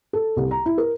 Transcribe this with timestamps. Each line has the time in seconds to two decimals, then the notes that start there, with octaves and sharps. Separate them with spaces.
0.13 A4
0.36 C2
0.51 A#5
0.66 E4
0.78 A#4